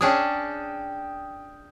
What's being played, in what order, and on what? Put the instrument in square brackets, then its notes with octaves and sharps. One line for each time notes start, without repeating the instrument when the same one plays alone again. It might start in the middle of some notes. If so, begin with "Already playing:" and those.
[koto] C#4 D4 G#4 [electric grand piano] G5 D#6